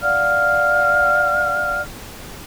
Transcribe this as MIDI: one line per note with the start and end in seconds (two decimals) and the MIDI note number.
0.01 1.82 74
0.01 1.82 77
0.01 1.82 78
0.01 1.82 89